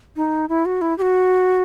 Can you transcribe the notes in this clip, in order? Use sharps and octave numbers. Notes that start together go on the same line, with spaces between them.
D#4
E4
F#4
E4
G4
F#4